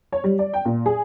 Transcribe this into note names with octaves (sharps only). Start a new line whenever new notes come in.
C#5
G3
D5
G5
A#2
G#4